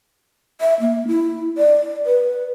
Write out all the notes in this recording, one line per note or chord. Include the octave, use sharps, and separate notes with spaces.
E5
A#3
E4
D5
B4